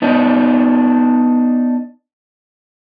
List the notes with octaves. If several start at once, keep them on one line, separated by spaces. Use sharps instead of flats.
B3 D4 D#4